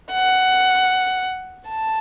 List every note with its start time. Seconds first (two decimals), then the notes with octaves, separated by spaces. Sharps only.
0.12 F#5
1.69 A5